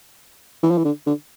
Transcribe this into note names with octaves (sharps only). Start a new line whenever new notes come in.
E3
F3
E3
D3
D3